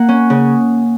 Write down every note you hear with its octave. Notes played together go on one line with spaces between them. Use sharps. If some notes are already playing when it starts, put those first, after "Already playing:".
Already playing: A#3 F#5
C#4
C#3